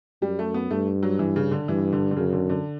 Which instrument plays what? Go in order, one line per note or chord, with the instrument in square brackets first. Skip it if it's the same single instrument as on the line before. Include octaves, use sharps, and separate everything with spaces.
[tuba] F#2 [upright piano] G3
[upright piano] A3
B3
[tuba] G2 [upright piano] A3
[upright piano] F#3
E3
C#3
D3
[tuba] G2 [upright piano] E3
[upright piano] D3
D3
[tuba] F#2 [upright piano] C#3
[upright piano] D3
D3